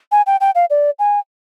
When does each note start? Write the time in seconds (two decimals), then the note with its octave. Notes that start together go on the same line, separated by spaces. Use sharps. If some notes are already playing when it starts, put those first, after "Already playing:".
0.12 G#5
0.27 G5
0.41 G5
0.55 F5
0.70 D5
0.99 G#5